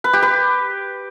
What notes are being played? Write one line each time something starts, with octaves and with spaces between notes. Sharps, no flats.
B4
G4
B4